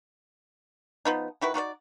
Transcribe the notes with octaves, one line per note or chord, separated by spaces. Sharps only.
F3 B3 D#4
D#3 E4 F#4 B4
D#4 F#4 B4 D5